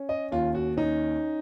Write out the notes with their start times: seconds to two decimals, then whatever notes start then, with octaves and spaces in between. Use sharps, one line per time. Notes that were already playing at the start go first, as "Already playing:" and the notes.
Already playing: C#4
0.09 D#5
0.31 D#2 F4
0.55 F#4
0.77 C#4 D#4